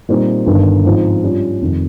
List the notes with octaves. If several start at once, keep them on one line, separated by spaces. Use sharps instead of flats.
A#2 G3 C4 D#4
G1 G2 D#3
G#2 F3 C4 D#4
G2 G3 C#4 F4
F1 F2 D#3